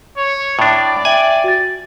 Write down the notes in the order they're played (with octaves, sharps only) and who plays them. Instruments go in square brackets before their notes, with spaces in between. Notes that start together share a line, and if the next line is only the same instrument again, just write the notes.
[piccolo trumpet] C#5
[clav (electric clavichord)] A2 D4 [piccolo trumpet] D5
[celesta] E5 G5 F#7 [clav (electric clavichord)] G#5
[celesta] F#4 A6